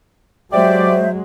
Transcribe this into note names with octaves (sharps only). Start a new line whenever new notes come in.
F#3 G#3 G4 C5 D5 E5